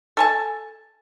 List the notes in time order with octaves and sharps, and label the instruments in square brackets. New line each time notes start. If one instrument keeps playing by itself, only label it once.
[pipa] A4 G#5 A5